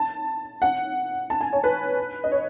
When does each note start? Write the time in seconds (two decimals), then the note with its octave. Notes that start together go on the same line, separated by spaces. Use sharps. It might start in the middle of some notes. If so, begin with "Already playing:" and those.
Already playing: A5
0.62 F#5
1.30 A5
1.41 G#5
1.53 C#5
1.64 B4
2.24 D#5
2.32 C#5